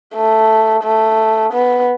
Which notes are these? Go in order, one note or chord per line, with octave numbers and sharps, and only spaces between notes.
A3
A3
B3